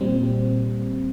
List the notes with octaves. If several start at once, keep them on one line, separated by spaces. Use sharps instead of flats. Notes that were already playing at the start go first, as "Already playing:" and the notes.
A#2 G3 C4